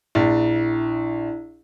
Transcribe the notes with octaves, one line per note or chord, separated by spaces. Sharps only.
A#1 E4